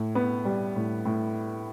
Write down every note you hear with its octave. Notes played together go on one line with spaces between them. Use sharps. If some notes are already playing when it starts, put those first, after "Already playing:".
Already playing: A2
B3
G3
A2
A2